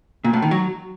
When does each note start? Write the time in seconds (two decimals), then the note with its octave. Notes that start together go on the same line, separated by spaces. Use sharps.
0.24 A#2
0.33 A2
0.42 D#3
0.51 F#3